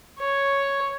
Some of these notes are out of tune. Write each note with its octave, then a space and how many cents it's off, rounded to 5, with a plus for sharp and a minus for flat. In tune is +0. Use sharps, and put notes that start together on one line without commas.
C#5 +0